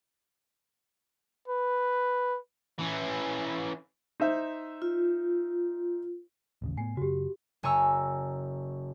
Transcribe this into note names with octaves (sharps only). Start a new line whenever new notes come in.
B4
E3 C#4
D#4 C5 E5
F4
A1 D#2 C#3
A2 B3 G#5 C7
F#2 C#3 F#4 G4
F#1 G#5 A#5 C#6 E6